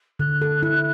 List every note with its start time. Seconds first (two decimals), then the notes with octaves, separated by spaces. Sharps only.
0.19 D3 F#6
0.42 A4
0.63 E4